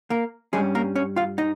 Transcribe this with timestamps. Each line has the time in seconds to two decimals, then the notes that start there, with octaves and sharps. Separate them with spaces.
0.10 A#3 A#4
0.53 G2 G3 G#3 C#4 G#4
0.75 A#3 A#4
0.95 C#4 C#5
1.16 F4 F5
1.38 D#4 D#5